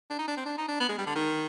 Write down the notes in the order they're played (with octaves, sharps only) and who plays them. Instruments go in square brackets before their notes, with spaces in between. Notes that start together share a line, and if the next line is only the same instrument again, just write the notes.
[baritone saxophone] D4
D#4
D4
C4
D4
D#4
D4
B3
G#3
G3
D3
D#3